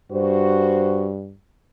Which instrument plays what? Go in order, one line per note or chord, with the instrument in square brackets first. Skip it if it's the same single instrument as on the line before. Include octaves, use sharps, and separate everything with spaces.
[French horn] G2 [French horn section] F#4 C5